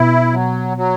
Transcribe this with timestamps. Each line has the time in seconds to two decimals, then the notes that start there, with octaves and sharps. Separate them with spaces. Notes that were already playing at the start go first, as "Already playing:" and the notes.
Already playing: B2 E4
0.32 F#3
0.77 F#3